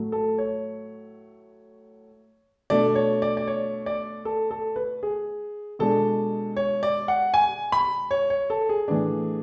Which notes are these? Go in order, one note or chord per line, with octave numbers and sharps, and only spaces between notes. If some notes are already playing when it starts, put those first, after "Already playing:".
Already playing: A2 F#3 A3
A4
C#5
B2 A3 D4 D5
C#5
D5
D5
C#5
D5
A4
A4
B4
G#4
B2 G#3 D4 A4
C#5
D5
F#5
G#5
B5
C#5
C#5
A4
G#4
A2 E3 B3 D4